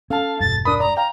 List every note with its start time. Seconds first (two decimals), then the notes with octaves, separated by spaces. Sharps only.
0.10 C#4 A4 F5 A5
0.40 E1 G2 A6
0.65 D4 A#4 B5 D#6
0.80 D5 A#5
0.97 F5 G5 A#5